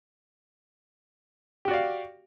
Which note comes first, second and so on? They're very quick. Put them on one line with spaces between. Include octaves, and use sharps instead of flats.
G4 F#4 D5 F5